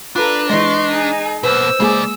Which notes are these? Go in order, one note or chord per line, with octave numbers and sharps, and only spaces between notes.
D4 F4 A4 B4 A#5
E3 G#3 D#5 C6 C#6
D#4 G#4
B2 A#3 B4 C5 E6
C#3 G#3 A#3 G#4 D5